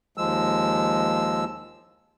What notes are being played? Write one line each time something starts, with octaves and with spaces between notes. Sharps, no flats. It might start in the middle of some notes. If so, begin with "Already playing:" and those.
D#2 F3 G#3 E6